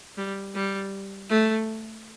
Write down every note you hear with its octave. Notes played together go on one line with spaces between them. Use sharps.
G3
G3
A3